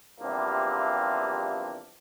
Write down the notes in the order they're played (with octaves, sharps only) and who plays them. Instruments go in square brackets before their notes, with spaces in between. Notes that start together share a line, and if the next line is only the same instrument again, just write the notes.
[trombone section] E2 C3 F3 G3 A#3 D4